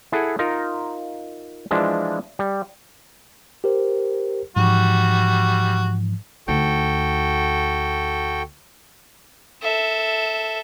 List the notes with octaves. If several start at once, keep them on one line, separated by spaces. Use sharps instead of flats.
E4 G#4 A4 F#5
D#4 F4 A#4
E3 F3 G#3 D4 E5
G3
G4 A#4 C5
G#2 E3 F3 G3 F#4
D2 D#4 F#4 A4 G5
A4 E5